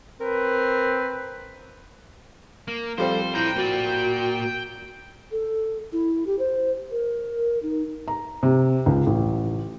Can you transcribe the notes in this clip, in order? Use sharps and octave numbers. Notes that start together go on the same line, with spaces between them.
C4 A#4 B4
A#3
F3 G3 C4 A4 C5
E4 C5 G5 A#5
A#3 F#4 D5
A4
E4
G4
C5
A#4
D#4
A#5
C3
C#2
A1